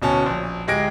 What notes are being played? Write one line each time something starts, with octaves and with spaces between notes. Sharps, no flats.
D1 B2 C#4 A5
A#1
D1 G#3 G4 G#6 A#6 D7